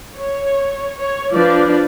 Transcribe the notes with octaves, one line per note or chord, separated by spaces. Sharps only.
C#5
C#5
F3 D4 B4 D5